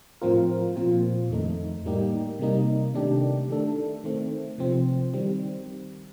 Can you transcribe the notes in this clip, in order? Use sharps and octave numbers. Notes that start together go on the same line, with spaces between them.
A2 F3 C4 F4 A#4
A#2 F3 C4 F4
F2 D#3 A3 D#4
A2 G3 A#3 D#4 G4
C3 G3 A#3 D#4
C3 D#3 A3 D4 G4
D#3 A3 D4 A4
D#3 A3 C4
C3 F3 C4
D#3 G3 C4